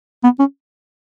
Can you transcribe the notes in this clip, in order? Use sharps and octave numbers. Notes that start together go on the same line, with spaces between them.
B3
C#4